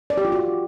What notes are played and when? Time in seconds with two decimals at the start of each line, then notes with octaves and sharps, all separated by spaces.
0.10 D5
0.17 G4
0.25 F4
0.32 F#4